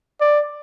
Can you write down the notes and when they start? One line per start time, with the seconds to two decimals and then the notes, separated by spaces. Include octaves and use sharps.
0.21 D5